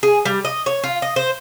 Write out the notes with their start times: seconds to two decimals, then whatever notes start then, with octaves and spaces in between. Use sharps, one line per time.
0.03 G#4
0.25 G3
0.45 D#5
0.66 C#5
0.84 F4
1.02 D#5
1.16 C5